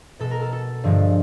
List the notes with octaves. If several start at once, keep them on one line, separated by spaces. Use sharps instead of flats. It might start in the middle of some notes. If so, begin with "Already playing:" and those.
B2 G#3 A4
A#4
A4
A4
G2 D3 F3 G#3